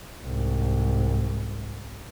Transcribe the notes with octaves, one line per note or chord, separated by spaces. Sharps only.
C2 G#2